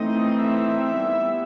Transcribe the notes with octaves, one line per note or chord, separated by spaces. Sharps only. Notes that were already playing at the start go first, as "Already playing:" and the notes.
Already playing: E3 A3 C4 D#4 D#5
E5
G3 B3 E4